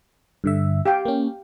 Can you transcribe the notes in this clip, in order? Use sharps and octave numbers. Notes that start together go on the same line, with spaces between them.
G2 D3 E5
G4 F5 G5
A#3 C#4